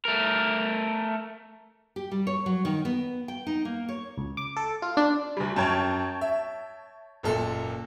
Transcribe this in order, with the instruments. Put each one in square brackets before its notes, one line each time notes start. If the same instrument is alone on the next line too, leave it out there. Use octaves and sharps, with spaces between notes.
[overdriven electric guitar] A3 A#4
[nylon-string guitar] G4
G3
C#5
F#3
D#3
B3
G5
D#4
A#3
C#5
[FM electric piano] C#2
D6
A4
F4
D4
[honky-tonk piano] D2 G3
[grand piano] F#2 [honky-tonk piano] C#5 G5 A5
[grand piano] E5
F#1 A#2 A4